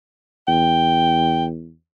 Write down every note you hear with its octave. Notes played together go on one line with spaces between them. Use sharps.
E2 G5